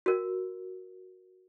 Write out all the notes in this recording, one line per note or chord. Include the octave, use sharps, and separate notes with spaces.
F#4 A#4